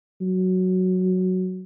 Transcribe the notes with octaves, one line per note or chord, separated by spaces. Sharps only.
F#3